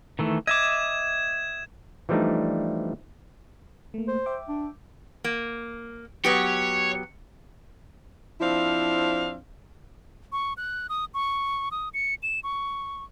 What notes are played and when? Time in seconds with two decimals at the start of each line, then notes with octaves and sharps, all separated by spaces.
0.19 D#3 E3 A3
0.47 D#5 E5 D6 G#6 E7
2.09 E3 F3 G3 A3 D4 D#4
3.94 A3 A#3
4.08 C5
4.26 E5 G5 D6
4.49 D4
5.24 A#3
6.24 F#3 B3 G4 C#5
8.40 F3 C4 D4 E4 F5
10.32 C#6
10.57 F#6
10.89 D#6
11.14 C#6
11.71 D#6
11.94 C#7
12.23 E7
12.44 C#6